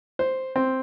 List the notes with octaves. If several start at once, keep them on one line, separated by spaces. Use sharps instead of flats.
C5
C4